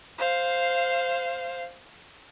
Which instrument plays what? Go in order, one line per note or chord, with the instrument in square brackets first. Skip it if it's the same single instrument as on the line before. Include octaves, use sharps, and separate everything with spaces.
[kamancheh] C5 F5